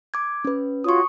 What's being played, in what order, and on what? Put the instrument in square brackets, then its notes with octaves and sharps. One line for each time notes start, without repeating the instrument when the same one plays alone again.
[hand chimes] D6 G#6
C#4 B4
[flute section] F4 F#4 C#5 [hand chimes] C#6 D#6